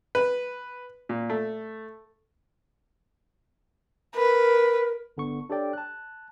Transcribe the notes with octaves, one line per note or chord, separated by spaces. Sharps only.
B4
A#2
A3
A#4 B4
G1 D3 B3 C#6
D4 G4 A4 C#5 D5 G5
A5 F#6